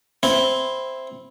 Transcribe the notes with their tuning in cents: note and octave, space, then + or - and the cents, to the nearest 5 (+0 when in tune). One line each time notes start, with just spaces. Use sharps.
C4 +0 E4 +0